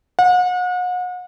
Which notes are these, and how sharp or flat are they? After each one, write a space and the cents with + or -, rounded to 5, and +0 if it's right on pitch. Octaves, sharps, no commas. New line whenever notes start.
F#5 -40